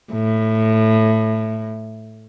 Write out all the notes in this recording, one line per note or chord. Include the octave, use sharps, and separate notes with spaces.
A2